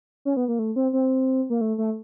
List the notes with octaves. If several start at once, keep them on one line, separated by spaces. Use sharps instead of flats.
C#4
B3
A#3
A3
C4
C4
A#3
A3
A3